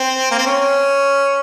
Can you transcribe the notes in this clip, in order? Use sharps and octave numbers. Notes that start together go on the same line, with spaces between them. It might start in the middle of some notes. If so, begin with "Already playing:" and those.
Already playing: C4
A#3
C4
C#4